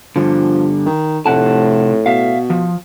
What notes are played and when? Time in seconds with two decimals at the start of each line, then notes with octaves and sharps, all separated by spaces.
0.16 G2 D3 F3
0.86 D#3
1.26 F1 A2 C3 F#5 A5
2.06 B2 E5 F5
2.50 F3